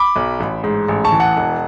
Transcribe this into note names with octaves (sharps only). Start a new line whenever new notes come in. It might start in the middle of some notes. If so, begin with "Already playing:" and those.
Already playing: B5 D6
B1
A1
G#2
A1
A5 C#6
E3
F#5 A5
E1